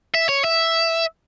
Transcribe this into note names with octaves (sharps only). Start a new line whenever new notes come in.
E5
C#5
E5